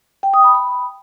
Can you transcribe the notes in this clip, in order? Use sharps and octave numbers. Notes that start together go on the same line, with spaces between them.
G5
D#6
B5
B5